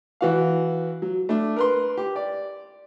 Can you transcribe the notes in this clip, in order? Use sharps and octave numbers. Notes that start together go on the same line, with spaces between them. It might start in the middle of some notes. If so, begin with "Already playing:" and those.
E3 F#4 F5
F#3
A3 D4
A#4 B4 C6
G4
D5